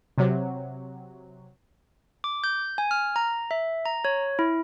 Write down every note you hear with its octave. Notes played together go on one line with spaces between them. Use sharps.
C3 F#3
D6
G6
G#5
F6
A#5
E5
A#5
C#5
E4